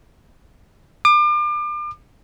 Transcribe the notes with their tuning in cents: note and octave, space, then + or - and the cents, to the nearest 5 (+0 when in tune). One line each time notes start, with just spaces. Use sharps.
D6 +35